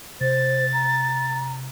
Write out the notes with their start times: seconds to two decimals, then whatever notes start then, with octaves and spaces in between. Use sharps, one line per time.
0.21 C3 C5 A6
0.73 A#5